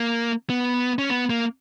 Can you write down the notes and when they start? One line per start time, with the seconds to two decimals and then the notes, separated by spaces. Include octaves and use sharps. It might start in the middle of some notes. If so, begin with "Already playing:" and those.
Already playing: A#3
0.50 B3
0.99 C#4
1.10 B3
1.30 A#3